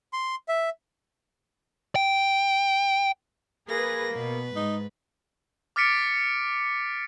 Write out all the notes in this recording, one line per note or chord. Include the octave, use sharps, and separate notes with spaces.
C6
E5
G5
A#3 G#4 B4 A#6
B2 B4
G#2 D#4
D6 F6 A6 B6 C#7 D7